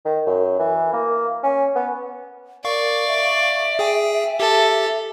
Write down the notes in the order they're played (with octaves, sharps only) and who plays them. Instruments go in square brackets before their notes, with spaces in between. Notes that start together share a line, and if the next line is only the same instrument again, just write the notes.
[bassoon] D#3
F#2
E3
A#3
C#4
B3
[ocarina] A#4 [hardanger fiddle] D5 [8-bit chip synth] F5 C#6
[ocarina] E5
[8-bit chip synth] G#4 G5 G#5
[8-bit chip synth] G4 [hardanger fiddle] A4